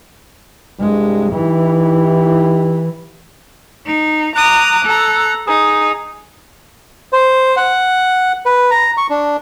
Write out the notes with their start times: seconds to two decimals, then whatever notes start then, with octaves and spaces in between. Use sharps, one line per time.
0.80 C2 G2 C3 G#3
1.32 E3 D#4 E4 G4
3.86 D#4
4.36 A#5 D6 D#6 F#6
4.85 A4 A#5
5.47 D#4 G#4
7.13 C5
7.57 F#5
8.46 B4
8.71 A#5
8.97 C#6
9.10 D4